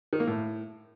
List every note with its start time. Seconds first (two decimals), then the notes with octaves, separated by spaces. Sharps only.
0.13 D#3
0.20 A#3
0.27 A2